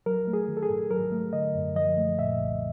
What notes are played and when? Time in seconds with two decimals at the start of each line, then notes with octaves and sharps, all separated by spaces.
0.06 F#3 A#4
0.28 A3
0.33 G#4
0.48 D#3
0.57 A4
0.63 G#4
0.70 G#2
0.90 F#3 A#4
1.12 A3
1.33 D3 D#5
1.54 F#2
1.75 F3 D#5
1.97 A3
2.18 A#2 E5
2.39 C2